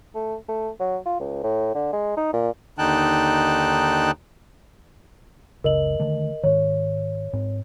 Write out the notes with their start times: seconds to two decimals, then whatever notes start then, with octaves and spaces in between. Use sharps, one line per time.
0.15 A3
0.48 A3
0.80 F#3
1.06 F4
1.20 C#2
1.43 A2
1.75 D3
1.93 G#3
2.17 D#4
2.33 A#2
2.78 D#2 D3 D#4 G5 A5 F#6
5.64 F#1 C#2 C#3 A#4 D#5 F#7
6.00 D3 D#3 A3
6.44 G#2 D#3 C#5
7.33 G#2 C4